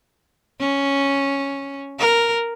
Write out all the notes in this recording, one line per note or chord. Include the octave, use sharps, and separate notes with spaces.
C#4
A#4